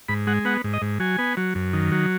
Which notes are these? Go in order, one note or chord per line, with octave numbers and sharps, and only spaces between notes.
G#2 B5
G#3 F#5
B3 F#5
G#2
D#5
G#2
F#3 G#5
B3
F#3
F#2
D#3
F#3